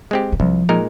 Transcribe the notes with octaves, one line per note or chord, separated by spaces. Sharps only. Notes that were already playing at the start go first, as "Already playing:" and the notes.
G#3 C4 G4
D#3
C2 F3
A#2 G#3 D#4 A#4